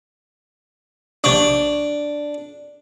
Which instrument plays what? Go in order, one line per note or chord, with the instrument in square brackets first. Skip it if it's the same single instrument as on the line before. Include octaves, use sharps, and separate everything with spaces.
[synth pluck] A#1 C3 C#6 [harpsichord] D4